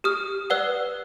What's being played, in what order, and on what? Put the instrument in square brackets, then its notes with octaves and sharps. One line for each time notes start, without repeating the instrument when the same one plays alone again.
[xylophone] G4 D#6 F6
B4 D5 F#5 E6 F#6